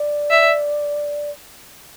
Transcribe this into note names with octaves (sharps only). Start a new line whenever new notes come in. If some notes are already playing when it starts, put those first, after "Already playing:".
Already playing: D5
E5